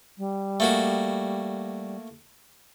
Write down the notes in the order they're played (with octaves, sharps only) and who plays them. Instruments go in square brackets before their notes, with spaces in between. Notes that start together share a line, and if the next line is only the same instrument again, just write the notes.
[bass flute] G3
[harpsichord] A3 A#3 F#4